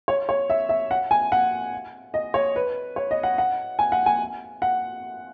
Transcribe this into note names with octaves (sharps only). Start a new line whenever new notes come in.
C#5
C#5
E5
E5
F#5
G#5
F#5
D#5
C#5
B4
C#5
D#5
F#5
F#5
G#5
F#5
G#5
F#5